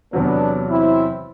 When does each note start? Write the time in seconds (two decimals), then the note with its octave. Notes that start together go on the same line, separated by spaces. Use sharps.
0.13 E2 C3 F#3 B3 D4
0.70 C4 E4